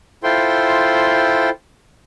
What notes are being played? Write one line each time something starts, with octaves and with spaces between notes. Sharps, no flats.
E4 F4 A4 C5 G5 C6